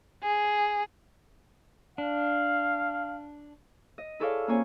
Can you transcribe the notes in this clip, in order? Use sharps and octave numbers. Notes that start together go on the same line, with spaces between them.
G#4
D4 F5
D#5
E4 G#4 A4 C#5 D5 F5
A#3 C4 C#4 F4 C#5 G#5